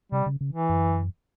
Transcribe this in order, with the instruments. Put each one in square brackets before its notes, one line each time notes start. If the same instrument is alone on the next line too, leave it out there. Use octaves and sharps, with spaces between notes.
[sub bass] C3 [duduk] G3
[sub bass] C#3
C#3
[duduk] E3
[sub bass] F#2